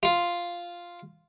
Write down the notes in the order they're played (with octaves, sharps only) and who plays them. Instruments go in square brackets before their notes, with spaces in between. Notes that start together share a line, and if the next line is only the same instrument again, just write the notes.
[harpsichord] F4